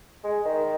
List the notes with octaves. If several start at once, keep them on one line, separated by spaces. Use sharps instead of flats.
G#3
D#3